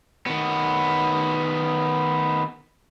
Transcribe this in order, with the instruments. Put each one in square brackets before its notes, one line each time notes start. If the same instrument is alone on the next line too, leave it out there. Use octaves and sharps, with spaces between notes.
[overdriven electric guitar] D#3 B3